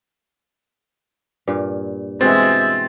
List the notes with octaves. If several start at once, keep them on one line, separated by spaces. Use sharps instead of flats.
G2 A#2
B2 E3 G#3 C4 E5 A6